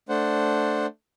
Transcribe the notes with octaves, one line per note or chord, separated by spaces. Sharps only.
A3 D4 C5 F#5